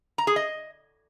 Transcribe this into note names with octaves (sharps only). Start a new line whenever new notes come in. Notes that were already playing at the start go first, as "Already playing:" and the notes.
A#5
G#4
D#5